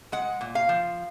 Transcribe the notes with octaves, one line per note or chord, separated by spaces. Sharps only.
G#3 F#5
A#2
F5
F3